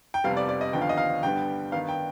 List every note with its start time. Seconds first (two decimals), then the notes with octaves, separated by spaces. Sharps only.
0.14 G5
0.24 F1 F2 C3 G3 B3 F5
0.37 D5
0.49 D5
0.61 D#5
0.73 D#2 D3 F3 B3 G5
0.81 F5
0.89 D#5
0.97 F5
1.23 G2 D3 G3 B3 G5
1.72 G2 D#3 B3 F5
1.89 G5